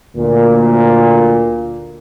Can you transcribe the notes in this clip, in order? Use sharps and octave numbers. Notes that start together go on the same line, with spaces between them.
D2 A#2